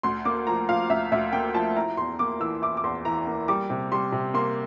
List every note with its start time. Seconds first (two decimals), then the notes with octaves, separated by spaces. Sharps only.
0.03 D2 C6
0.25 A#3 D6
0.47 F3 A#5
0.69 F3 F5
0.90 D2 E5
1.12 D2 E5
1.33 A#3 G5
1.55 F3 A5
1.76 E4 A#5
1.97 E2 C6
2.19 A#3 D6
2.40 E3 E6
2.62 E4 D6
2.77 D6
2.84 E2 C6
3.05 E3 A#5
3.27 A#3
3.48 G3 D6
3.70 C3
3.92 G3 C6
4.12 C3
4.34 A#3 C6